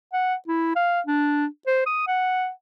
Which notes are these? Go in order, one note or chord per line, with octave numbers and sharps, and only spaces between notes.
F#5
E4
F5
D4
C5
D#6
F#5